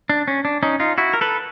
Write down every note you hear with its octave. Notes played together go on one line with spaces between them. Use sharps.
D4
C#4
D4
C#4 D#4
D#4 F4
E4 F#4
A#4
A4 B4